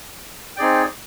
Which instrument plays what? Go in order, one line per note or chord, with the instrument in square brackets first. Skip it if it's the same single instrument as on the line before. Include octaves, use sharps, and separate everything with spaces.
[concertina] C4 D#4 G#4 D5 G5